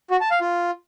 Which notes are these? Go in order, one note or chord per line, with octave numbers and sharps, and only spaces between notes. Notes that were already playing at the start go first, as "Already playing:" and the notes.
F#4
A5
F5
F4